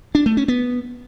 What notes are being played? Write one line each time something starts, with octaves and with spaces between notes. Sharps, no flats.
D4
A3
C#4
B3